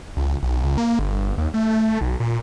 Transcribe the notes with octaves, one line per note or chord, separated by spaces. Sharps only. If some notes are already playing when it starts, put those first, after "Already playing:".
C#2
B1
C#2
A#3
G1
D#2
A3
B1
A#2